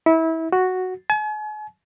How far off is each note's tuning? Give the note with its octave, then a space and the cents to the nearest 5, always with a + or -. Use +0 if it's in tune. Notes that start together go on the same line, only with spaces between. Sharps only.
E4 -25
F#4 +0
G#5 +40